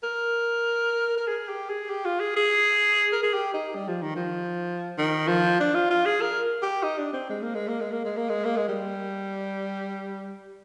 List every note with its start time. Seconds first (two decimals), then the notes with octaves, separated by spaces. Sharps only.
0.03 A#4
1.17 A#4
1.28 G#4
1.49 G4
1.69 G#4
1.90 G4
2.05 F4
2.20 G#4
2.36 G#4
3.12 A#4
3.23 G#4
3.34 G4
3.54 D#4
3.75 G3
3.88 F3
4.02 D#3
4.16 F3
4.98 D#3
5.28 F3
5.60 D4
5.75 F4
5.90 F4
6.06 G#4
6.21 A#4
6.63 G4
6.83 D#4
6.98 D4
7.13 C4
7.30 G#3
7.42 A#3
7.55 G#3
7.68 A#3
7.80 G#3
7.92 A#3
8.05 G#3
8.17 A#3
8.29 G#3
8.45 A#3
8.56 G#3
8.68 G3